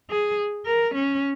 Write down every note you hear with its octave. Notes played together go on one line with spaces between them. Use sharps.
G#4
A#4
C#4